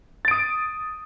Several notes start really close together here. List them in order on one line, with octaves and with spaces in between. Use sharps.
A6 D7 D#6